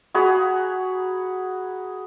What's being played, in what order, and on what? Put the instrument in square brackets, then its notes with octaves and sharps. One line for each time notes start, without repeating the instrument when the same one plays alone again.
[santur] F#4 G#4 A#5 B5